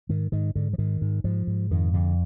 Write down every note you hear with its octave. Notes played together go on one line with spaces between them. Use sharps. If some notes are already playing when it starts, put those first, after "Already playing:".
G#2 D#3
G#2 D#3
G#2 D3
F3
G#2 D#3
G#2
G#2 F3
G#2
F2 D#3
F2 D3